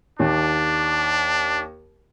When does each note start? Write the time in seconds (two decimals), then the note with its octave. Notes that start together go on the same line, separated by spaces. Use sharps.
0.19 D#2 D4